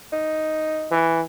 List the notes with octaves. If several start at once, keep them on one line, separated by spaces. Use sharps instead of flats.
D#4
E3